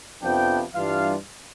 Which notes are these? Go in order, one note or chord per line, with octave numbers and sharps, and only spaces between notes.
F2 C3 F3 B3 D4 G5
G2 E3 G3 D4 F4 F5